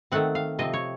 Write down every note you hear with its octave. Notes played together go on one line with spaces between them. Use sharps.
D#3 A3 C4 F#5
F5
C3 F3 C4 D#5
C#5